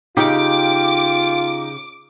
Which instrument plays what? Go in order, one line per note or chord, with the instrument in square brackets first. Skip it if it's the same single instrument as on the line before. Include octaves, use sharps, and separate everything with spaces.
[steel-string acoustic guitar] C#3 G4 [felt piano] D#4 [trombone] F4 [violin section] D6